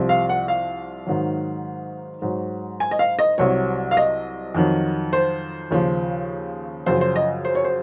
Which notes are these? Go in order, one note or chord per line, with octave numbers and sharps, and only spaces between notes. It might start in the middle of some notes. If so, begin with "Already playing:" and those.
Already playing: C2 C3 F3
F5
F#5
F5
G#2 D#3 F#3
G#2 F#3
G#5
D#5
F5
D#5
C2 C3 F#3 C#5
F5
D#5
F2 D#3 F#3
C5
D#2 C#3 F3
F#2 C#3 F3 C5
C5
D#5
C5
C#5
C5